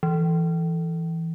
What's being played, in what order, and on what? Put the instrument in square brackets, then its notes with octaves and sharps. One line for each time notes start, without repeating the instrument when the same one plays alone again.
[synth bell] E3